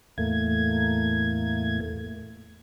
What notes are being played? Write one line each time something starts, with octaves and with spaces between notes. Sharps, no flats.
E2 A2 A3 A#3 G#6